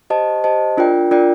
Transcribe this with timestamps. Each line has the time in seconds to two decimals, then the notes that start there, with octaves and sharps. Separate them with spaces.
0.10 G4 C5 D#5 A5
0.44 G4 C5 D#5 A5
0.77 D4 F4 A#4 D5 G5
1.11 D4 F4 A#4 D5 G5